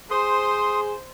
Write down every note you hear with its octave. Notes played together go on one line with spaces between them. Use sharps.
G#4 C5 C6 D#6